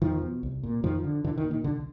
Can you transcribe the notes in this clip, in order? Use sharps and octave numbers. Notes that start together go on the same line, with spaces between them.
E2 D#3 F3
B2
C2
A#2
F2 D#3 F3
D3
C2 D3 E3
D#3
A#2
D#3
C2 D3